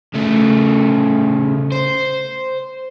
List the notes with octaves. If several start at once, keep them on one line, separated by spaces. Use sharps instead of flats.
C#3 A3
C5